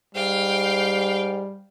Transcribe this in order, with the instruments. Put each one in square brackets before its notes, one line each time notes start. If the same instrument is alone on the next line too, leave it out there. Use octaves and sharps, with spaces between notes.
[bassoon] G#2 [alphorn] G3 [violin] F5 G5